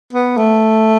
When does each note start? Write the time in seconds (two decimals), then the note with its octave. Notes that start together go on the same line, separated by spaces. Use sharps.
0.13 B3
0.37 A3